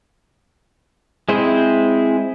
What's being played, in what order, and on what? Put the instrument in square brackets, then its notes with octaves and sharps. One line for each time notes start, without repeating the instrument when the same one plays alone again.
[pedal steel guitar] G#3 C4 E4 G#4 C5